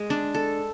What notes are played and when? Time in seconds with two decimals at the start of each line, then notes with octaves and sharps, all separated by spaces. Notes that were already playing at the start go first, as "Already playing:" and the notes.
Already playing: G#3
0.10 D4
0.35 A4